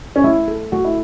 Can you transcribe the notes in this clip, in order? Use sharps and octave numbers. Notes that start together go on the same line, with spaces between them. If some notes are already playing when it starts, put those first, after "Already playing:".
C#4
A3 E4
A4
A3 F#4
E4